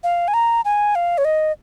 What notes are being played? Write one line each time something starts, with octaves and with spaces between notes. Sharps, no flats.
F5
G#5
A#5
G#5
F5
C#5
D#5